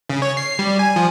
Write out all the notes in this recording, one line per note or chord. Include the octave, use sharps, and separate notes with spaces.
C#3
C#5
C7
G3
G#5
F3